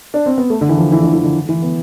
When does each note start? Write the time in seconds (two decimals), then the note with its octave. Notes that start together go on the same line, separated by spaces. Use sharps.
0.14 D4
0.26 C4
0.38 B3
0.50 A3
0.61 D3
0.69 E3
0.78 F3
0.92 E3
1.03 D3
1.14 E3
1.24 D3
1.49 E3
1.62 B3